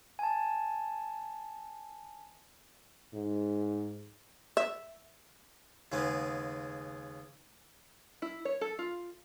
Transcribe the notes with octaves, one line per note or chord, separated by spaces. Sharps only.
G#5 A5
G#2
E5
D#2 C#3 G#3 B3
E4
C#5
A4
F4